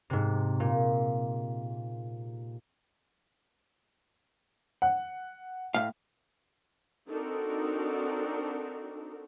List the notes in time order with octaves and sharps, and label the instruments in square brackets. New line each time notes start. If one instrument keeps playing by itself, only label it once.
[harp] G#2 C3
A#2
[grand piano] F#5
[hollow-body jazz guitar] A2 F5
[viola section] C4 D4 D#4 F#4 A4 A#4